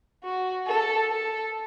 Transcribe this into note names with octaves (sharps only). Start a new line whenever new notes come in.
F#4
A4
A4